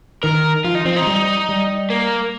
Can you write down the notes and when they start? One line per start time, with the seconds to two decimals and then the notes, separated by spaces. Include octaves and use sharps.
0.23 D#3 A#4
0.65 F3 F4
0.75 D#4
0.85 F3 C4
0.96 D#4
1.03 F3
1.07 G3
1.49 G3
1.90 A#3